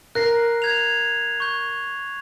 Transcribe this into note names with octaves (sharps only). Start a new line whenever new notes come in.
A#4 F#6 A#6 C7
G6 G#6 F7
C#6 G6